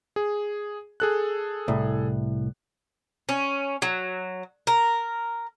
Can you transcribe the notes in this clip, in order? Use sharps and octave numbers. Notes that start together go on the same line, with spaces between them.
G#4
G#4 A4 F#6
C2 A2
C#4
F#3
A#4